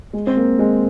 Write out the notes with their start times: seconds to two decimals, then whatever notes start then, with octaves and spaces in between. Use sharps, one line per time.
0.13 G#3
0.27 C4
0.37 A#3
0.59 G#3